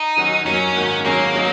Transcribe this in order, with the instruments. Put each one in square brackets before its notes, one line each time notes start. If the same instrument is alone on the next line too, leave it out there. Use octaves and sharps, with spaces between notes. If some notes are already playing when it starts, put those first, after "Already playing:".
Already playing: [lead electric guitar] D#4
[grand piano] D#3 F#3 C#4 F#4
[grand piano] F#2 F#3 A#3 [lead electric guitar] C#4
[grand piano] G#2 D#3 A#3 F#4 A#4
[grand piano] D#3 F#3 C#4 G#4 [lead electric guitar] A#3
[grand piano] F#3 D#4